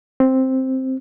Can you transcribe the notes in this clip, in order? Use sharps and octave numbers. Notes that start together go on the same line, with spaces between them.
C4